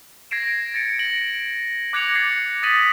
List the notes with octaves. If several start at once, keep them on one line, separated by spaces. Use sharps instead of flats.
G#6 A#6 C7 D7 E7
A6 A#6 C#7 D7
A#6 D7 F#7
D6 F#6 G#6 A#6 C#7 F7
G#6 A6 C7 C#7
D#6 A6 B6 D#7 F#7